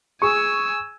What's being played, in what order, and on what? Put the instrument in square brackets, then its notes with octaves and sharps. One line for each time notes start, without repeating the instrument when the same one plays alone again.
[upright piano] G#4 C#6 [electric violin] G#5 E6